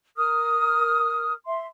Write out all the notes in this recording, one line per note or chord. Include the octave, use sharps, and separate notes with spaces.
A#4 D#6 F6
E5 C6